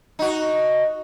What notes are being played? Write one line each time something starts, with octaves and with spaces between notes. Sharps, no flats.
D#4 F#4